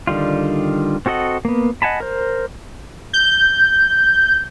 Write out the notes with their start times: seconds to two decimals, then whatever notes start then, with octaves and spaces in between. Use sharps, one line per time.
0.07 D3 D#3 G3 F4
1.06 C4 F#4 A4 D#5 F#5
1.45 A#3 B3
1.82 D#5 F#5 G#5 A5 B5
2.00 A#4 C5
3.13 G6